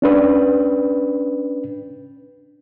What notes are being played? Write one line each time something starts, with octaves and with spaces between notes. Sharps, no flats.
C#4 D4 B4